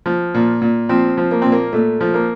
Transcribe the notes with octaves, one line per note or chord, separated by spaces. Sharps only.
F3
A#2
A#2
F3 C4
F3
A#3
A#2 C4
A#3
A#2 A3
F3
A#3